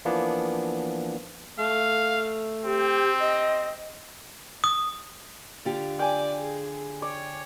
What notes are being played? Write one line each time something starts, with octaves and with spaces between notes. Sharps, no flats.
E3 F3 A#3 B3 D4
A3 F5
C4 G4
D#5
D#6
D3 F4 G4
D5 G5 G#5
G#4
C#5 D5